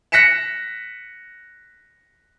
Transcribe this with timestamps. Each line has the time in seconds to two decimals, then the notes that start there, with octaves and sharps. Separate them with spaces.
0.12 F#6 A#6 B6 C#7 E7